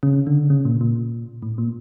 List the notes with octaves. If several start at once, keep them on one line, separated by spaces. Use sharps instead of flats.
C#3
D3
C#3
A#2
A#2
A2
A#2